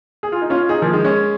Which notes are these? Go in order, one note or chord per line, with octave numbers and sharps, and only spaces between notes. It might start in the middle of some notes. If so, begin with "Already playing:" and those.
G#4
F4
D#4
C#4 F4
D#4 G#4
F3 A#3
D#3 G#3
G#3 C#4